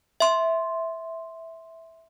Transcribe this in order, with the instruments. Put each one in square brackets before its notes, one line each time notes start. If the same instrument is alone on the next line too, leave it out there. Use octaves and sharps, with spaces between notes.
[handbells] E5 C6